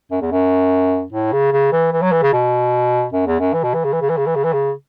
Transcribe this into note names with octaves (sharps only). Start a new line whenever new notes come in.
F#2
E2
F#2
A2
C#3
C#3
E3
E3
F#3
E3
C#3
B2
F#2
E2
F#2
E3
B2
E3
C#3
E3
C#3
E3
C#3
E3
C#3
E3
C#3